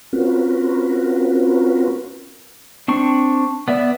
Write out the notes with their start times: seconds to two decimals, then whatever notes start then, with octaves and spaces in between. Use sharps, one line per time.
0.13 C4 C#4 F4 F#4 A#4 B4
2.88 C4 D4 C#6
3.68 B3 D5 E5